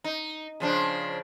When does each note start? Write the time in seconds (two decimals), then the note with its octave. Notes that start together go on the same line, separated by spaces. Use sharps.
0.04 D#4
0.60 C#3 F3 D4